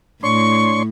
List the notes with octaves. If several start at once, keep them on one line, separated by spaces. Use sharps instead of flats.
A2 D4 C#5 C6 C#6